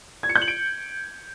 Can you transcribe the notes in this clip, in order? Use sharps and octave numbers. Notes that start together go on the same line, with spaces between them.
G#6
C#7
G6
F#7
D7